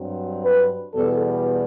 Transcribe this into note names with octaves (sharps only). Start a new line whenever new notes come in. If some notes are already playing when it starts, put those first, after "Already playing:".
Already playing: G2 F#3 C4
B4
E2 B2 G3 B3 A4